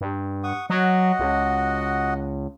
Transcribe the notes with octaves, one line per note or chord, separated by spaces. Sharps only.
G2
F#5 C#6 D#6
F#3 F#4 D#5 F#5
C#2